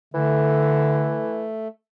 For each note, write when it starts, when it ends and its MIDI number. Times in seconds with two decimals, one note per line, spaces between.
0.14 1.24 50
0.14 1.48 52
0.14 1.68 57